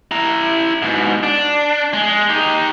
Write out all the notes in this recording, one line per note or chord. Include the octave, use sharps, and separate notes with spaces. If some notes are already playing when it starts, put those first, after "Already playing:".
E4 A#5
G#2 B2
D4
G#3
D#4 G4